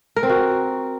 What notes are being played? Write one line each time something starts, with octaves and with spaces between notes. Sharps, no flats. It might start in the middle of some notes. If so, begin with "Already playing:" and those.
A#4
C4
F#4